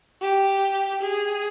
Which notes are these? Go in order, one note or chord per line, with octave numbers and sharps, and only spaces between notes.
G4
G#4